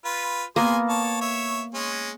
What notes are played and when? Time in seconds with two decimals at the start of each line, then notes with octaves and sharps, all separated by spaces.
0.05 F4 B4
0.56 A#3 B3 G#4 G#5 C6
0.89 C#5 A5
1.21 C#5 E5
1.74 G#3 C#4